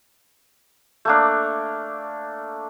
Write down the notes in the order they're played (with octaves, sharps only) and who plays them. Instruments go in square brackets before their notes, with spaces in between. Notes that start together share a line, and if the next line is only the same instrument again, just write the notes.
[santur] A3 A#3 D4